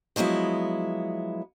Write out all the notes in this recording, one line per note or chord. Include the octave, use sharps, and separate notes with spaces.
F3 F#3 G#3 B3 E4